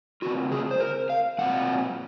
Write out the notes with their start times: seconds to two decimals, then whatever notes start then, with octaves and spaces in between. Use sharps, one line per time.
0.22 C#3 F3 C4 F4 F#4
0.51 G#4
0.71 C5
0.80 A#4
1.10 F5
1.38 A#2 F#3 C4 F4 F#5